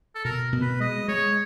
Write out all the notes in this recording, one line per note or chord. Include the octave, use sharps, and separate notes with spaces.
A4
B2 A#4
B2
B4
G#3 D#5
G#3 C#5